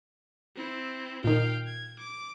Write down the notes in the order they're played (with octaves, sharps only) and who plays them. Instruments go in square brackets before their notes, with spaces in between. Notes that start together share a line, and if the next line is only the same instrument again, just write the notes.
[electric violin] C4 E4
[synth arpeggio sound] A#2 D#3 [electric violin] F5 G5
[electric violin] G#6
D6